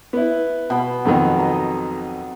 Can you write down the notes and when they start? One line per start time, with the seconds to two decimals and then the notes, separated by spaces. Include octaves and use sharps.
0.13 B3 E4
0.70 B2 B5
1.05 B1 F2 D#3
1.36 D#5 A#5